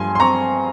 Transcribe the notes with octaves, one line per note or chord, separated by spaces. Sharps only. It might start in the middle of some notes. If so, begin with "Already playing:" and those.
Already playing: G2 F3 G#5 C6
C6
C4 A#5 C#6